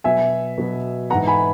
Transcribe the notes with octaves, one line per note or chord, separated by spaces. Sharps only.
B2 F#3 B3 E5 G#5
B2 F#3 B3
G#2 E3 B3 F#5 A#5
G#5 B5